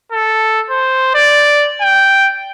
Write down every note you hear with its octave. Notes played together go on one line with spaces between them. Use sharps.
A4
C5
D5
G5